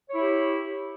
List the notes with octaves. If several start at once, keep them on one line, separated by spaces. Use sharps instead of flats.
E4 G4 C#5